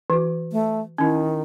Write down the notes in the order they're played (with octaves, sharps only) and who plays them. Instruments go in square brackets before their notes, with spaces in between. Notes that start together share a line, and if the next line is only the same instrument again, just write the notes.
[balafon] E3 F#4
[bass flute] A3
[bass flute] D#3 [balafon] C#4 E4